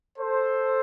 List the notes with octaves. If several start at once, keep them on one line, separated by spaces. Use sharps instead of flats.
A4 C5